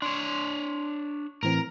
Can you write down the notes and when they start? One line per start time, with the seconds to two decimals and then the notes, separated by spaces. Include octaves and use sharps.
0.02 D4 C#5 C6
1.43 A2 E3 C4 A#4